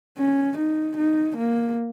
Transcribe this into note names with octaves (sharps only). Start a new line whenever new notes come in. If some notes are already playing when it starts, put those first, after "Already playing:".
C#4
D#4
D#4
A#3